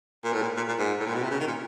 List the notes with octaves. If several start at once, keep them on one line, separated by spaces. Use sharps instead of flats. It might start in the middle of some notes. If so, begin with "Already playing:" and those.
A#2
A2
A#2
A#2
A#2
G#2
A2
A#2
B2
C3
C#3
D#3
A#2